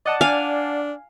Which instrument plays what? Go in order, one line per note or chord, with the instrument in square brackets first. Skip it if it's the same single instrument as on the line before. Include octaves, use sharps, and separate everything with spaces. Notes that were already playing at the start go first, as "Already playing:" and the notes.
[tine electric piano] D5 F#5 A5 [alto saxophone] D#5
[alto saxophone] D4 [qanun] F5 G#5